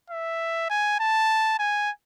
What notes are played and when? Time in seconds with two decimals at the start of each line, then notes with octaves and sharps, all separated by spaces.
0.10 E5
0.70 G#5
1.00 A5
1.59 G#5